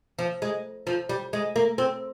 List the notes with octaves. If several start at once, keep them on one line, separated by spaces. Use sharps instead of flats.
F3
G#3
F3
G3
G#3
A#3
C4